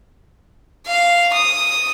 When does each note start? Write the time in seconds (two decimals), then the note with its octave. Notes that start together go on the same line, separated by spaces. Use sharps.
0.87 F5
1.34 D#6